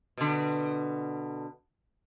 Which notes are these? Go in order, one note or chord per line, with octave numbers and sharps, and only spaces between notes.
B2 D3